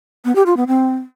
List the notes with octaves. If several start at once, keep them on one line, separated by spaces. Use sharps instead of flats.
B3
G4
F4
B3
C4